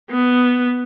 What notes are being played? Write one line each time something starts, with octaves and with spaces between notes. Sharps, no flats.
B3